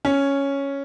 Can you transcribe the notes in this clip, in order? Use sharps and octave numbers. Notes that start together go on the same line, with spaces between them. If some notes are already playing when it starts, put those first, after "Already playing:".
C#4